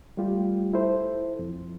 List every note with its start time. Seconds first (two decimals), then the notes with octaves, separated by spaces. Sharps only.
0.17 G3 A3 F4 G4
0.73 E4 A4 C5
1.39 F2